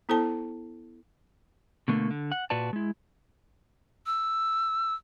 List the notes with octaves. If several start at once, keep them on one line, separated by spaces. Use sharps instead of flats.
B3 E4 A4 C5 G5 A5
B2 D3 A3 A#3
D3
F#5
A#2 F#4 B4 D5 A5
G#3 E4
E6